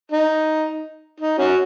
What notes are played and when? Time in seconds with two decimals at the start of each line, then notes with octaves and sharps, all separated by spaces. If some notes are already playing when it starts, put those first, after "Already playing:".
0.12 D#4
1.20 D#4
1.38 C#4 F#4